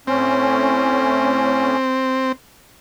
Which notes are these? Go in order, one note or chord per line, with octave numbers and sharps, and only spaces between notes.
A2 C4 C#4